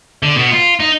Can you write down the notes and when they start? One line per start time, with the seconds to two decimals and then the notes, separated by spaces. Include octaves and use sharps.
0.23 D3
0.35 B2 B3
0.51 F4
0.80 D#4